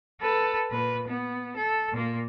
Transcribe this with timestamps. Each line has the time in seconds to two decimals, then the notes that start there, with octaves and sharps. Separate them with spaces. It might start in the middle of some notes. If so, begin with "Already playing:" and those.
0.21 A4 B4
0.71 A#2 B4
1.08 B3
1.56 A4
1.92 A#2 A#3